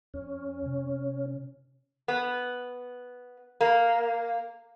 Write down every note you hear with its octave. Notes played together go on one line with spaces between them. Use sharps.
F2 C#4
C3
B3
A#3